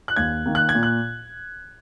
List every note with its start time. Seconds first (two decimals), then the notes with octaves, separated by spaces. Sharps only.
0.08 F#6
0.16 D#2 G#6
0.46 D#3 A#3
0.55 F#6
0.69 G#6
0.74 A#2
0.83 F#6